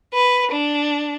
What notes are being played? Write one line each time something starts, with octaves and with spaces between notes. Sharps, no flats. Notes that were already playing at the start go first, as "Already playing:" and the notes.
B4
D4